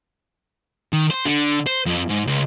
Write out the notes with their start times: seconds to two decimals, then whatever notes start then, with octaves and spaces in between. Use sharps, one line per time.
0.93 D#3
1.10 C5
1.25 D3
1.66 C5
1.86 F2
2.09 G#2
2.27 C#2